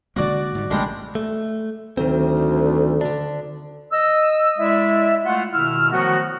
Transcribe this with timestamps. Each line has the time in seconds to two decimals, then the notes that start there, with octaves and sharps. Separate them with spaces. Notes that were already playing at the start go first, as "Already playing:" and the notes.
0.16 D3 G#3 A#3 F#4 D5
0.55 G#2 G3
0.71 A1 C#3 G3 G#3 A#3 D4
1.15 A3
1.97 D2 D#3 F#3 C4
3.01 D3 D4
3.93 D#5 E6
4.59 G#3 E4 D5 E5
5.24 G#3 A3 F4 F#5
5.53 B2 D#3 E4 E6 F6
5.92 D#3 F3 F#3 A3 B3 F#4